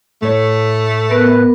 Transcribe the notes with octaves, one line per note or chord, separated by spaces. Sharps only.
A2 A3 C#5
B3 A#4 B4